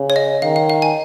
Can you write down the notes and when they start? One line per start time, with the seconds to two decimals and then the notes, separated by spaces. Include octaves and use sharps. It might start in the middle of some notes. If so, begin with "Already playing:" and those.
Already playing: C#3
0.10 C#5
0.16 D#5
0.42 D#3 F5
0.56 F5
0.70 F5
0.82 G#5